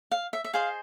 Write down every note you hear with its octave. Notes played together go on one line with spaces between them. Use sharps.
F5
E5
E5
G#4 C5 D#5 F5